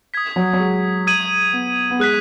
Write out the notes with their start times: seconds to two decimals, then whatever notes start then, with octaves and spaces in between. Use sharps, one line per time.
0.14 D#6 G#6 B6
0.36 F#3
0.53 F#3
0.60 G#3
1.07 D#6 G#6 D#7 F#7
1.53 B3
1.90 B3
2.00 G#3 D#6 F#6 B6